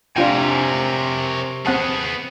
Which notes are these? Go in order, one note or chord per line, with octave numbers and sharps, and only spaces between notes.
C3 D4 F4 A#4 C5 C#5 G5 G#5
B3 C4 G#4 F#5 A5